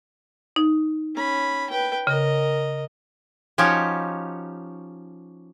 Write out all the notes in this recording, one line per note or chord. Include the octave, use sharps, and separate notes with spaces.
D#4
C#4 B5
B4 G5
C#3 A#4 D#5
F3 C#4 D#4 F#4 G4 C#5